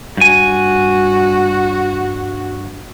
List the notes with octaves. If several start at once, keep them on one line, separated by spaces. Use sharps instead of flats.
G2 F#4 G#5